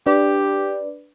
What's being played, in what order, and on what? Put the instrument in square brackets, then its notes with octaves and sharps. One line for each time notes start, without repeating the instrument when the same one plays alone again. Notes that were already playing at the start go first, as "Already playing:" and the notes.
[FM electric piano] D4 B4 D5 [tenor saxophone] G4